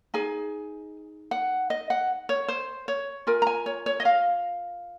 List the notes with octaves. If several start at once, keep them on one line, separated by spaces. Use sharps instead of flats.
D#4 G#4 G#5
F#5
D#5
F#5
C#5
C5
C#5
F4 A#4 G#5
A#5
G#5
C#5
C#5
D#5
F5